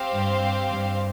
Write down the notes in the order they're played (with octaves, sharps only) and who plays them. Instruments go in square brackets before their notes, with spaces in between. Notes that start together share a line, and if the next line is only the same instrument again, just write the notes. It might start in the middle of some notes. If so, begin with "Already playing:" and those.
Already playing: [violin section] C4 G4 C5 F5
[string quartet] G2
G2